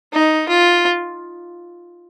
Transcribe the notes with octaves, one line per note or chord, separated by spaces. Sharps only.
D#4
F4